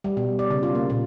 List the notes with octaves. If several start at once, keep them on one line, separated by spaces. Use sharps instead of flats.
G3
B2
D5
C#3
F4
A#3
A#2